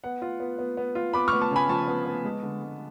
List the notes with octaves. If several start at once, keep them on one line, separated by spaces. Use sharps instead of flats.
B3 F#5
F4
B3
B3
B3
F4
B3 B5 D6
C#6 F6
B3
A5 C#6
C#3 G#5 B5
F3 A5 C#6
B3
B3
G#3
D3
G#3